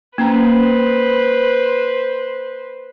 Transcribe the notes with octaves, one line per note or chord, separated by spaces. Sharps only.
A#3 C#4 B4 C5 A#5